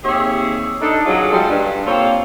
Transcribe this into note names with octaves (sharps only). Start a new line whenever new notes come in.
D#2 C4 G4 G#4 C#5 E5
D4 D#4 A4
G2 F#3 C#4 F4 G#4
F3 G3 G#3 A4
G2
A#3 C4 F4 A4 C5 C#5